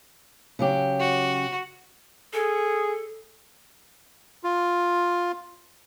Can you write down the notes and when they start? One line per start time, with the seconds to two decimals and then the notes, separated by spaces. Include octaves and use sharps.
0.59 C#3 F#3 G4
1.00 F#4
2.33 G#4 A4
4.44 F4